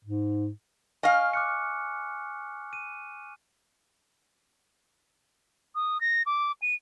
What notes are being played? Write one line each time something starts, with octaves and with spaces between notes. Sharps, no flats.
G#2
D#5 F5 G#5 C#6 F6
D6 F#6 C#7
D#7
D#6
A#6
D6
D#7